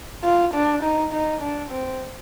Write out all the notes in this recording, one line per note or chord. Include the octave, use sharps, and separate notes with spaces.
F4
D4
D#4
D#4
D4
C4